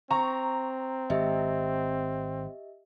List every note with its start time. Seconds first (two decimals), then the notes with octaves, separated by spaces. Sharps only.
0.11 C4 A#5 C#6
1.10 G#1 G4 D#5 E5